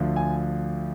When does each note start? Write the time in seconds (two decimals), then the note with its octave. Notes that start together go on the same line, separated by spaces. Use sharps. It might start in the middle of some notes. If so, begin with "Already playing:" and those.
Already playing: D2 D3 F3
0.16 G#5